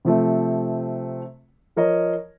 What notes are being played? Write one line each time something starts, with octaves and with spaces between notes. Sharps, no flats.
C3 F3 A3 C4
F3 A#4 C#5 D#5